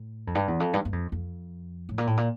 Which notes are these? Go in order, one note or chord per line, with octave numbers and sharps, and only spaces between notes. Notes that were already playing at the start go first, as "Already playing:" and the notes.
Already playing: A2
F2
G2
E2
F2
G2
G2
F2
F2
A2
A#2
A2
A#2